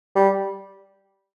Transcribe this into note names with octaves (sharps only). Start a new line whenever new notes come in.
G3